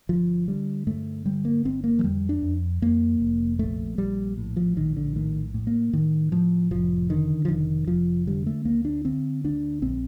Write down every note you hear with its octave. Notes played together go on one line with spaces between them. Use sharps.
G1 F3
D3 G3
G2 A3
D3 G3
A#3
G1 C4
A#3
F3
F2 G3
D4
F2
F2 A#3
F1
A#1 A3
A#1 G3
A2
F3
A#1 D#3
D3
A2 D#3
A2
A#3
A2 D#3
A2 F3
F1 F3
D3 D#3
F3
F1 D#3
F1 F3
D3 G3
A3
D2 A#3
D4
D3 C4
D2 D4
A#1 C4